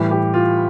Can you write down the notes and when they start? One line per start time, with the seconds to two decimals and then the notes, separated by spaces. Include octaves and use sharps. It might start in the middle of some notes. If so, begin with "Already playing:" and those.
Already playing: A2 E3 G3
0.11 G4
0.34 F4